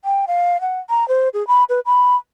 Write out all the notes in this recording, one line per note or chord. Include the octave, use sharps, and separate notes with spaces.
G5
F5
F#5
A#5
C5
G#4
B5
B4
B5